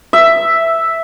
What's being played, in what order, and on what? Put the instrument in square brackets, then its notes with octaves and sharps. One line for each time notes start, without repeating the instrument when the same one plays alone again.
[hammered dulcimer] E5